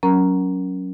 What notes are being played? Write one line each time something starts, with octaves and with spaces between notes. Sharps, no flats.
F#3 C#4 A#4 A#5